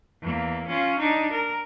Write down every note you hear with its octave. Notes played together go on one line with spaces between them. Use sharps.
E2 A#3
C#4 F4
D4 D#4
A#4